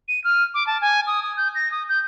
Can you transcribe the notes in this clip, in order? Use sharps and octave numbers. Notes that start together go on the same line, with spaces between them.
D#7
F6
D6
A5
G#5
D#6
D#6
G6
A#6
D#6
G6